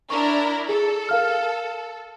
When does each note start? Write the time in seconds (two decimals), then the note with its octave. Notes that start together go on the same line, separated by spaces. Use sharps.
0.10 D4 E4 A#4 C#6
0.69 G#4 A4
1.09 A#4 F5 F6